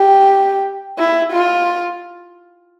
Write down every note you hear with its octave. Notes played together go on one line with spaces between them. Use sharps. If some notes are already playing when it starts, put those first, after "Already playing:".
Already playing: G4
E4
F4